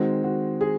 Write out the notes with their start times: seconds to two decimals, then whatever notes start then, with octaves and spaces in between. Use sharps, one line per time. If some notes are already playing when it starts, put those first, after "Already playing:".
Already playing: D#3 G#3 C4 F#4
0.24 F#4
0.61 G#4